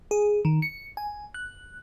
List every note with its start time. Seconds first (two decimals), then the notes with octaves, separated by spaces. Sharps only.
0.11 G#4
0.45 D#3
0.62 C#7
0.97 G#5
1.34 F#6